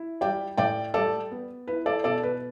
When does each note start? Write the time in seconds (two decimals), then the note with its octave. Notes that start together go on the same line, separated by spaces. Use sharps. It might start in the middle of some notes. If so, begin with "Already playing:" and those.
Already playing: E4
0.21 G3 D5 G5
0.57 A2 D5 G5
0.94 G3 A4 D5
1.31 B3
1.67 E4 B4
1.86 A4 D5
2.04 B2 A4 D5
2.23 B4